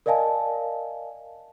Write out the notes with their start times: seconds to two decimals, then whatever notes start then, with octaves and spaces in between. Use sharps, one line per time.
0.06 A#4 D5 D#5 F5 G#5 A5